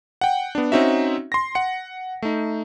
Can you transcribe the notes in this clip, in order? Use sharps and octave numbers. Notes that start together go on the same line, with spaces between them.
F#5 G5
B3 D4
C4 C#4 D#4 F#4 E5
C6 A#6
F#5 C#7
A3 D#4